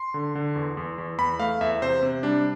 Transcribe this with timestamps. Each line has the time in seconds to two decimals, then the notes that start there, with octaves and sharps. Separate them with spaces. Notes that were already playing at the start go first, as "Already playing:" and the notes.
Already playing: C6
0.14 D3
0.35 D3
0.56 E2
0.77 E2
0.98 E2
1.19 E2 B5
1.39 A3 F5
1.61 E2 E5
1.82 C3 C5
2.03 C3
2.23 G3 D4